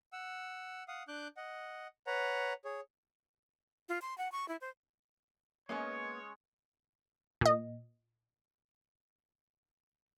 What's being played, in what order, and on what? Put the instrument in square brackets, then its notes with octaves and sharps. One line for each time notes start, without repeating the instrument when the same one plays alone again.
[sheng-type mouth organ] F#5 E6
F5 F#5 D#6
D4 D6 F#6 G6
D#5 F#5
B4 C#5 F#5 A#5
G#4 C#5
[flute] F4
C6
F#5
C#6
E4
C5
[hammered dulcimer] G#3 C#4 D#5 [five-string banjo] A#3 B3 [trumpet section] C#5
[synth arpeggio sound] A#2 D#5